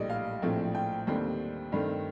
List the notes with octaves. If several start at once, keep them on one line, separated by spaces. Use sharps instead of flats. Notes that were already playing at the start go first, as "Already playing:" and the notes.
Already playing: A#1 A2 G3 D5 D#5
F5
A#1 A2 F3 C4
G5
D#2 D3 G3 C4
G2 D#3 A3 C4